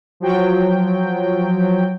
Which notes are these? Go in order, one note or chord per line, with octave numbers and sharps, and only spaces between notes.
F3 F#3 G5